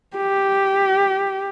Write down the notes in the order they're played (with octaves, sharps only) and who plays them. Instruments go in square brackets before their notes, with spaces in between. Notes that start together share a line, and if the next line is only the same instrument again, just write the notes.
[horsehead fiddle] G4